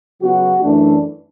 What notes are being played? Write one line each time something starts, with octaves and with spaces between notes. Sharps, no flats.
C#3 F#3 B3 F#4
F#2 E3 A3 D4